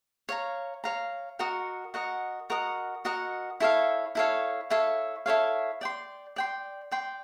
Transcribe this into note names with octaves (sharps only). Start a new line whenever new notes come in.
C#5 F5 A#5
C#5 F5 A#5
F#4 A#4 D#5 F#5
F#4 A#4 D#5 F#5
F#4 A#4 D#5 F#5
F#4 A#4 D#5 F#5
E4 A4 C#5 F5
E4 A4 C#5 F5
E4 A4 C#5 F5
E4 A4 C#5 F5
D5 G5 C6
D5 G5 C6
D5 G5 C6